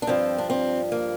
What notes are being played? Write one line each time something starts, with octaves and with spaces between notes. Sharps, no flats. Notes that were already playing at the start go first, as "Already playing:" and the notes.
D4
G2 F3 C4
D4
C4
A#3